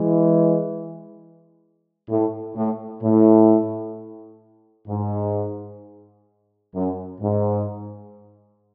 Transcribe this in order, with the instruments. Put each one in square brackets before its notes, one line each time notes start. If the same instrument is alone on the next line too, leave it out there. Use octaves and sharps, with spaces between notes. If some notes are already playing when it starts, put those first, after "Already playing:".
Already playing: [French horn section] E3 G#3
A2
A2
A2
G#2
F#2
G#2